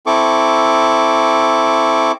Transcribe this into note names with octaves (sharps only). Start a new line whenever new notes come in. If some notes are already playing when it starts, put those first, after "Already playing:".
C4 E4 A4 C#6 D6